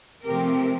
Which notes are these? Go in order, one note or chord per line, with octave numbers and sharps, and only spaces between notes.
C3 F3 A3 C4 G4 A#4